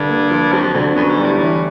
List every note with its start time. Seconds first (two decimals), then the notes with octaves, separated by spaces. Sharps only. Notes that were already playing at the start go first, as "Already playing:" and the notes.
Already playing: G2 D3
0.09 A#3
0.31 F3
0.52 F2 F#3
0.74 F2 D3
0.95 F#2 B3
1.09 G#2
1.17 G3
1.24 A2
1.38 A2 E3